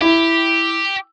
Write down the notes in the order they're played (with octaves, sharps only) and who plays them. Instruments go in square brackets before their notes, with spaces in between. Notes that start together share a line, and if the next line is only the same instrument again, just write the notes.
[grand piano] E4 [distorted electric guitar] G4